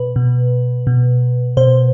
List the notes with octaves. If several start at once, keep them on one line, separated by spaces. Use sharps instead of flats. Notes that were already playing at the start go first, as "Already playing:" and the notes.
Already playing: B2 B4
B2
B2
B2 C5